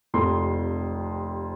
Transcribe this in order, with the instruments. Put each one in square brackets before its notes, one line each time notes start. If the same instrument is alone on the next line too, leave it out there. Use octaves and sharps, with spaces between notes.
[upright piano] F1 F2 C3 C6